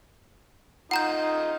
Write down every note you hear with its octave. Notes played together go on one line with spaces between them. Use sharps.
D#4 F4 D#5 F#5 A#5 G6